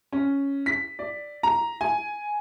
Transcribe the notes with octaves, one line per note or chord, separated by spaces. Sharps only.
C#4
B6
D5
A#5
G#5